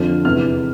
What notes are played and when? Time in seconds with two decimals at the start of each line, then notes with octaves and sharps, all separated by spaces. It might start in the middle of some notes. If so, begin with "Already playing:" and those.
Already playing: F2 D3 F3 F6
0.25 E2 C3 E3 F6